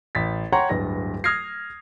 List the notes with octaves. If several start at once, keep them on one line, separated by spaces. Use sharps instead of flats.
A1 A6 B6
C#5 F#5 G5 A#5 C6 C#6
D1 G2 B4 A#6
D#6 F6 G#6 A#6 C7